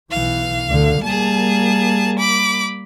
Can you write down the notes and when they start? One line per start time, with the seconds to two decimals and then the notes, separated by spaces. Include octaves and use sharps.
0.11 B1 E3 F5
0.67 D2 D3
1.03 G3 A#3 G#4 A5
2.19 B5 D6